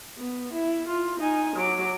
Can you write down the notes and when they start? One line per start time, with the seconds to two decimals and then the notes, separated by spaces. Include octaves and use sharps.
0.18 B3
0.53 E4
0.88 F4
1.20 D#4 G#5
1.56 F#3 D6